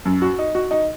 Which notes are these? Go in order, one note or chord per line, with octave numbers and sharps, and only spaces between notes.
F#2
F#4
D#4
F#4
D#4